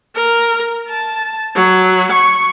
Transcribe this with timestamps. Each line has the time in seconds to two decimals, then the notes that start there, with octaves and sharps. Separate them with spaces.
0.16 A#4
0.88 A5
1.56 F#3
2.12 C#6